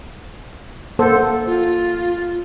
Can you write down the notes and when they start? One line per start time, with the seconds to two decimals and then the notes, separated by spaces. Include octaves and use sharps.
0.99 A#3 A4 C5 F#5
1.46 F4